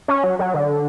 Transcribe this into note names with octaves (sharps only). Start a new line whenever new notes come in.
C#4
F#3
F#3
D3